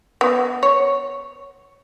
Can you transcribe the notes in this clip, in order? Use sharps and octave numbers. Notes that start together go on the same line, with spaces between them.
B3
C#5